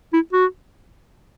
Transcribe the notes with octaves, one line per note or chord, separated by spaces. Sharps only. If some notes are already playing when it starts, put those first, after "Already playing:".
E4
F#4